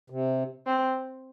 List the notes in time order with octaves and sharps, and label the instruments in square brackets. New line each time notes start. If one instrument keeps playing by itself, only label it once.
[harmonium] C3
[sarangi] C4